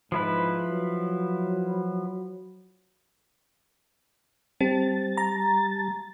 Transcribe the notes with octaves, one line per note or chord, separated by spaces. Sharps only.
G#2 F3 E4 B4
F#3
G3 C4 A5 A6
A#5